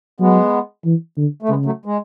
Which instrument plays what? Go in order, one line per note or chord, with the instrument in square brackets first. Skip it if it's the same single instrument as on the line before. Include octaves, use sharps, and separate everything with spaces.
[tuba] F#3 [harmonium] G#3 B3
[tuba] E3
D3
[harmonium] A3
[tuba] C#3 [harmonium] G#3 B3
[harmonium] F#3 A3
G#3